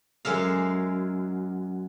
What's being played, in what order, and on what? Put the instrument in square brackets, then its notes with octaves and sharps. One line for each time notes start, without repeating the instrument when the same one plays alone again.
[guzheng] F#2 G#3 E5 F5